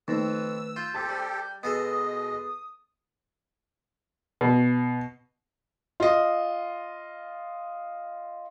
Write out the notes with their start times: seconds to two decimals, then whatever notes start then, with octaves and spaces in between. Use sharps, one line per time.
0.08 F2 D#3 A3 B4 E6
0.76 F4 G6
0.94 C4 G4 A4 A5 A6 B6
1.09 G3
1.63 B2 G#3 B3 G#4 A4 D#5 D#6
4.41 B2
6.00 F4 D#5